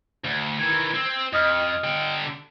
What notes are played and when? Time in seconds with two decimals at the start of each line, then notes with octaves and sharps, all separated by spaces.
0.24 D2
0.59 D#3 E3 G#6
0.95 C4
1.33 F2 D#5 D#6 F6
1.84 D3 G4